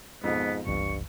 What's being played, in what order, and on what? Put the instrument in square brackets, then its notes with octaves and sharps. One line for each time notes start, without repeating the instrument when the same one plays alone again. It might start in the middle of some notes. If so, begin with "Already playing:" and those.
[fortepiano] F2 B2 [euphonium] G#2 [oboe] B3
[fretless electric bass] F#1 C2 E3 [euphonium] G2 [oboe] C#6